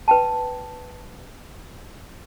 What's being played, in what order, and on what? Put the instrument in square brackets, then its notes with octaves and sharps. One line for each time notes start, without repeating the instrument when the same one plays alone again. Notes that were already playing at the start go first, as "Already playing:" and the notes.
[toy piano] B4 G5 A5